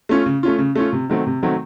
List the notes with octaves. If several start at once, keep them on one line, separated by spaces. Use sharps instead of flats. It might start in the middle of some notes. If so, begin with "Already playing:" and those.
A3 C#4 F4
C#3
A3 C#4 F4
C#3
A3 C#4 F4
C3
D#3 F#3 A3 C4
C3
D#3 F#3 A3 C4